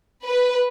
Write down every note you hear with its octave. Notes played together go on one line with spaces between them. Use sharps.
B4